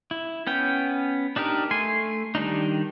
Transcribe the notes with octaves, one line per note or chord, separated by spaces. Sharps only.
E4
B3 C#4 G5
D4 D#4 G4 A#4
A3 G#5 C6
D#3 G3 D4 D#4